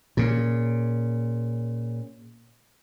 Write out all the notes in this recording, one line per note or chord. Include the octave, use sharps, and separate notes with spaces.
A#2 C#3